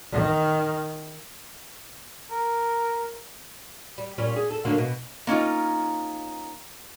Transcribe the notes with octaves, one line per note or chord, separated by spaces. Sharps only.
D#3
A#4
G3
A#2 G3 C#4
G#4
A4
D3 F#3 A#3
B2
A#3 C#4 D#4 F4